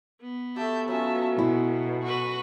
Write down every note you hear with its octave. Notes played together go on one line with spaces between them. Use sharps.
B3
A3 G4 E5 A5 G6
F#3 C#4 F4 E5 A5
B2 E4
F#4 B4